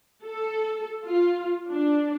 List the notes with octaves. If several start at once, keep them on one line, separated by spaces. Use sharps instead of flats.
A4
F4
D4